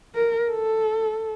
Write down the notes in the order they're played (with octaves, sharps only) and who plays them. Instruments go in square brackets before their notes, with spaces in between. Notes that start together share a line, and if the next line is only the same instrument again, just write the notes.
[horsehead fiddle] A#4
A4